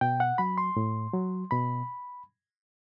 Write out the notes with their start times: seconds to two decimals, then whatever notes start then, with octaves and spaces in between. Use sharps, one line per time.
0.01 B2 G5
0.20 F#5
0.38 F#3 B5
0.58 C6
0.77 A2
1.13 F#3
1.51 B2 B5